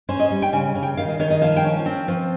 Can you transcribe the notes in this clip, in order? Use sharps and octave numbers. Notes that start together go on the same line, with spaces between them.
C#4 C5
D#5
G3
G5
C#3 G#5
C#3
G5
D#3 F5
D#5
D#3 C#5
D#5
F3 F5
G5
C#4
C4
F3